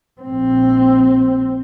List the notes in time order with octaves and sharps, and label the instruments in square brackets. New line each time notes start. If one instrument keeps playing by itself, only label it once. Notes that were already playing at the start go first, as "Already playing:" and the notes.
[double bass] A#1 C4